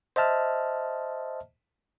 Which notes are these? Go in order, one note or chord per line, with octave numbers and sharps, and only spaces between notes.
C5 D#5 E5 A5 F6